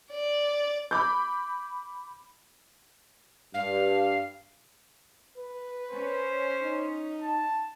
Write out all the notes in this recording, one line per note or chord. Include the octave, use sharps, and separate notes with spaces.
D5
B5 D6 G6
G2 F5
B4
C#4 C5
D#4
A5